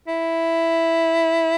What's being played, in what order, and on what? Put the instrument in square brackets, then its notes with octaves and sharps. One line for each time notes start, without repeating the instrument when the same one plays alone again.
[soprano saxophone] E4